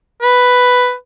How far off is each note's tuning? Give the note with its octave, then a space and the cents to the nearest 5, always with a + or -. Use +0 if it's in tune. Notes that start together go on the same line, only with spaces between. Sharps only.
B4 +5